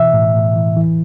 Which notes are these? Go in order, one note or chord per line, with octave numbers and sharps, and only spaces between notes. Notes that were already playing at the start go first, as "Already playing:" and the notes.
Already playing: B2 E3 E5
A2
A2
E3
E3